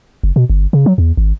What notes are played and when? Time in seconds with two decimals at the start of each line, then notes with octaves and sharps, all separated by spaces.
0.23 F#1
0.36 B2
0.50 G1
0.73 C#3
0.86 F#3
0.98 E2
1.17 G#1